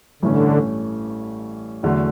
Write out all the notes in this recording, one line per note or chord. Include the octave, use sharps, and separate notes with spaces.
A1 G2 D3 E3 A3 C#4
E2 D3 F#3 A3